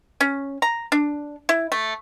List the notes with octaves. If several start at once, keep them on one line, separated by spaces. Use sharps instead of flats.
C#4
A#5
D4
E4
A3